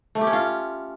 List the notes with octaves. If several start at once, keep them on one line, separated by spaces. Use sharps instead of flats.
A3
G4
C#4
F4